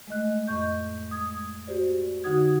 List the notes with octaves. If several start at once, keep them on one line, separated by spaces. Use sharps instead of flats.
G#3 A3 D#5 F#6
F2 A2 D#5 C#6 G6
G#3 D#6 G#6
F#4 G4 C5 D5
D3 D#4 F#4 F#5 D#6 G#6